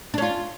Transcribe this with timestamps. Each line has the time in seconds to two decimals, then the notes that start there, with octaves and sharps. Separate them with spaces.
0.14 D4
0.18 C#4
0.22 F4